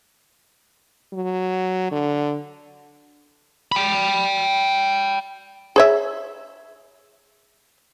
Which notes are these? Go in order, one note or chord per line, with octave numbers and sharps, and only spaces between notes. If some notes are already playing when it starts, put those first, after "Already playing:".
F#3
D3
G5 B5
G#4 C#5 E5